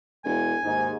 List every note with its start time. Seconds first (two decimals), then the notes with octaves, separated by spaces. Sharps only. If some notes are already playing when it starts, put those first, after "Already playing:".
0.24 E1 G#5
0.64 D#2 G#2 D#4